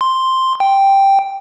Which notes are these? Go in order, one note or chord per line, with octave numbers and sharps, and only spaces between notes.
C6
G5